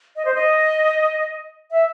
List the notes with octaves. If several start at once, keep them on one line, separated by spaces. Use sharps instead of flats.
D#5
C5
D#5
E5